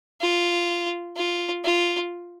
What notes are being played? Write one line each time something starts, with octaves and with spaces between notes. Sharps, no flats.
F4
F4
F4